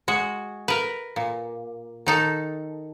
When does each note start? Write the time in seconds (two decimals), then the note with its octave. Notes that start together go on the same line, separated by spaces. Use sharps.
0.08 G#3 F#4
0.68 A#4 B4
1.16 A#2
2.06 D#3 D#4 A4